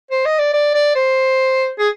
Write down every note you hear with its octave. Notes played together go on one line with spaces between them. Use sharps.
C5
D#5
D5
D5
D5
C5
G#4